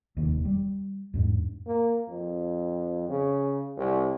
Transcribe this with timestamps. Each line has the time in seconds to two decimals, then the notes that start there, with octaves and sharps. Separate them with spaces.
0.17 F1 D#2
0.45 G3
1.14 E2 G#2
1.67 A#3
2.09 F2
3.09 C#3
3.77 C2